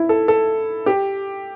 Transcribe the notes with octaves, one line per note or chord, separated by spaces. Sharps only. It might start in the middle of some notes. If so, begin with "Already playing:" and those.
Already playing: E4
A4
A4
G4